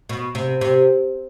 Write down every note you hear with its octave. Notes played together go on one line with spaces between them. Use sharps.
B2
C3
C3